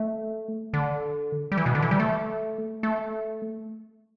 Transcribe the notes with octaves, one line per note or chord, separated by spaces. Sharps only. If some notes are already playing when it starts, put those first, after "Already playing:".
Already playing: A3
D3
G3
E3
B2
D3
E3
G3
A3
A3